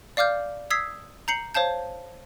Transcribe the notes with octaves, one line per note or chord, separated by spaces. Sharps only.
D5 F5 D6 F6 G6
D#6 E6 G#6 B6 C7
A#5 G6 C7 C#7 F#7
C5 C#5 F5 A5 G6